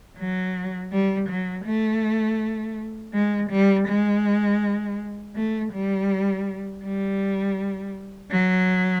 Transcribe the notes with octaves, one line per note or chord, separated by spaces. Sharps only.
F#3
G3
F#3
A3
G#3
G3
G#3
A3
G3
G3
F#3